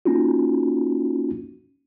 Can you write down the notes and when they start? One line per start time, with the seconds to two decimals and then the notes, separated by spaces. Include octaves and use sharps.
0.05 A#3 C#4 D#4 F4 F#4